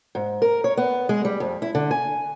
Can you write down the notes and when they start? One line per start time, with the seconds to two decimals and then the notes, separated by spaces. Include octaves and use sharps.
0.15 G#2
0.42 A#4
0.64 C#5
0.77 B3
1.09 G#3
1.25 G3
1.40 F2
1.62 E4
1.75 D3
1.91 G#5